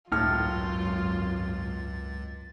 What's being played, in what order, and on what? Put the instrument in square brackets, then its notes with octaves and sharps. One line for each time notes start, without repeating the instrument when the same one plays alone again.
[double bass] G#1 F#2 [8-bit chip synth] C#2 A6 [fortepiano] A2 F6 [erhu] F4